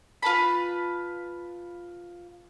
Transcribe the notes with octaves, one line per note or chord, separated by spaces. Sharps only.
F4 B4 A5 B5